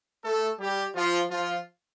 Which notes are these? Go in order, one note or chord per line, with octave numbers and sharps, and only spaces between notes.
A3 A4
G3 G4
F3 F4
F3 F4